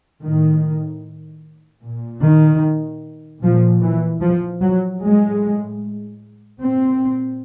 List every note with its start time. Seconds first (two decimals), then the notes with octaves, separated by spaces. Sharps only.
0.23 A2 D#3
1.83 A#2
2.23 D#3
3.42 A#2 F3
3.82 E3
4.21 F3
4.62 F#3
5.02 A2 G#3
6.61 A#2 C4